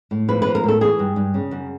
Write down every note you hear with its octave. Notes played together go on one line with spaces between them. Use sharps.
A2
F3 B4
F3 B4
A#4
A2 A4
E3 G#4
G2
G2
C#3
F#2